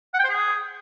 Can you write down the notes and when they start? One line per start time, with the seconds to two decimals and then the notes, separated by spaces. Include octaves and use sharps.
0.14 F#5
0.19 G5
0.24 C5
0.29 G#4